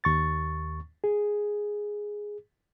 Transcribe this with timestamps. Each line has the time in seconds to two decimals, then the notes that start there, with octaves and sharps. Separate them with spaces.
0.04 D#2 C#6 A6
1.04 G#4